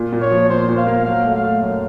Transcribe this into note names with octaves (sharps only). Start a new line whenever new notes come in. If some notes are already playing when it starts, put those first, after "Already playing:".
Already playing: A#2 F4
A#2
C#5
F3
A#2 C5
A#2
F5
A#3
F#3 F5
A3
F5
A3
F#2